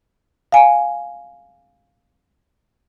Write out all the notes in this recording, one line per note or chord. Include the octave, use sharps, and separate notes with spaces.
F5 G#5